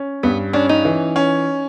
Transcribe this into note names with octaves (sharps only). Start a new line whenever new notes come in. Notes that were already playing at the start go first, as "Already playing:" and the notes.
Already playing: C#4
G2 B3
C#4 D4
D#4
E3
C#4